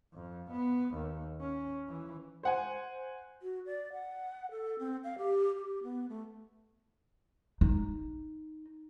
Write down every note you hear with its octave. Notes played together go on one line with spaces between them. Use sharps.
F2
B3
D#2
C#4
E3
C5 F#5 G#5
F#4
D5
F#5
A4
C4
F5
G4
G4
B3
A3
D#4